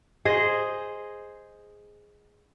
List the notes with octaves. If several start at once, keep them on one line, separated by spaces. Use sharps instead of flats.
G#4 C5 D#5